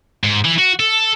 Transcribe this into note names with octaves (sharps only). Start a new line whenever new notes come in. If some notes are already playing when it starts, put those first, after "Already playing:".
G#2
E3
F#4
A4